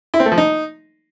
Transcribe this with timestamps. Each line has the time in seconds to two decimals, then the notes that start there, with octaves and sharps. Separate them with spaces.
0.14 E4
0.20 C4
0.26 A3
0.32 F3
0.38 D#4